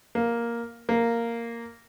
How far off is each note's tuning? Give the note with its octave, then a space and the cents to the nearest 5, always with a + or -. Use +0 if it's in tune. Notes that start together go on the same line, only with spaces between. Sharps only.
A#3 +5
A#3 -5